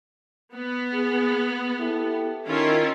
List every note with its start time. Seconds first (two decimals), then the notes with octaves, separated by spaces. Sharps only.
0.54 B3
0.93 G#4
1.80 E4 G4 A4
2.47 D#3 C#4 E4 F4